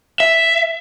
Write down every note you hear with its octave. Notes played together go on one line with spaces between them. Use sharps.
E5